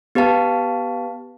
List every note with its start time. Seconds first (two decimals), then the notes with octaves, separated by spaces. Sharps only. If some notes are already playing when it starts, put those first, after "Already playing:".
0.15 B3 G4 B4 F5 A5